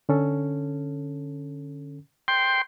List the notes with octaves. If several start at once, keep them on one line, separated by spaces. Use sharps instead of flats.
D3 C#4 A4
G5 C6